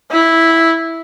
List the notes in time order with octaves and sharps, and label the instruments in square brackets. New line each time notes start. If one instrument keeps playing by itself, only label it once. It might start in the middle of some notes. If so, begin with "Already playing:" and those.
[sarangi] E4